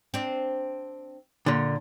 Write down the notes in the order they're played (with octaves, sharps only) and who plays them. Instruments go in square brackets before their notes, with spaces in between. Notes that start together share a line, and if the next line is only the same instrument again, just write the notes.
[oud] C4 D4
[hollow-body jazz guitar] A#2 D3